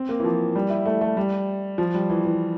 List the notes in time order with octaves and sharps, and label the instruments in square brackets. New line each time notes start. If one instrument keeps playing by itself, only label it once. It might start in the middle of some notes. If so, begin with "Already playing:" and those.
Already playing: [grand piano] C4
A#3
E3
F3
G3
E4
A3
A3
G3
F3
G3
E3
E3